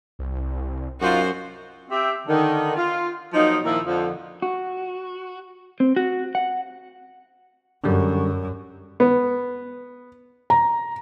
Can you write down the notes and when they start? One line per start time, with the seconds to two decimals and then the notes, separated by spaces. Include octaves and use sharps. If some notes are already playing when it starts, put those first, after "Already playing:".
0.19 C2
1.01 F#2 D#4 F4 F#4 C5
1.90 C4 G4 E5
2.27 D3 D#3
2.76 F4
3.34 F3 F#3 A#3 D#4
3.64 A#2 D#3 F3 E4 A#4
3.85 F2 D3 F3
4.42 F#4
5.80 C4
5.96 F#4
6.35 F#5
7.84 F#2 D3 G3
9.00 B3
10.50 A#5